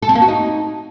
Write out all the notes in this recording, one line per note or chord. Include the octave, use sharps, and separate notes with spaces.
A4
C4
A#3
F#4
D#4